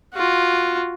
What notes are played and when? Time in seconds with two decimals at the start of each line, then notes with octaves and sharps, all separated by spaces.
0.15 F4 F#4